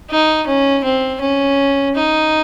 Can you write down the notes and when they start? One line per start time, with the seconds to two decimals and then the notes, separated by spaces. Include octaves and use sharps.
0.10 D#4
0.47 C#4
0.84 C4
1.21 C#4
1.95 D#4